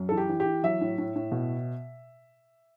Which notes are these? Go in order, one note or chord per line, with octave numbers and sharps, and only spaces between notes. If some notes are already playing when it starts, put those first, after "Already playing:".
Already playing: F#2
E3 A4
G4
E3
G4
E3
F#3 E5
A2
A2
A2
B2